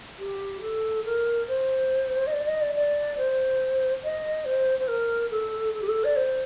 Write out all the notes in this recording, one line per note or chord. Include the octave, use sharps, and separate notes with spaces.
G4
A4
A#4
C5
D#5
D5
D#5
D5
D5
C5
D#5
C5
C5
A#4
A4
A4
G4
A4
D5
C5